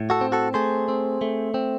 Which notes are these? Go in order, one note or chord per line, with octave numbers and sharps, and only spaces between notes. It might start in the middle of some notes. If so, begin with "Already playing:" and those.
Already playing: A2
F#4 A4
C4
F#4 A4
A3 G#4 C5
C4
A3
C4